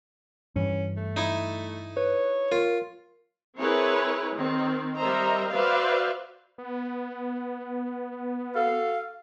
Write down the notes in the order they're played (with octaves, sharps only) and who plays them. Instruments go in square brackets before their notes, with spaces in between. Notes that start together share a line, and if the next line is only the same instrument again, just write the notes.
[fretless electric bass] G2 E3 [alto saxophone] C#4
[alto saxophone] A3
[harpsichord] D#4 E4
[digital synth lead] B4 [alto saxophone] C#5
[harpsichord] F4 [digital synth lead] A#4
[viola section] C4 E4 G#4 A#4 B4 C#5
D#3 C4
G3 A#4 C5 D#5 E5 A#5
F#4 B4 C5 D5 E5 F5
[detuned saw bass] B3
[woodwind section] F#4 A4 F5